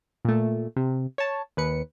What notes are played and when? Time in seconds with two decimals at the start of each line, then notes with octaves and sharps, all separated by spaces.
0.25 A#2 A3
0.76 C3
1.18 C#5 A5
1.57 D#2 B4 C#7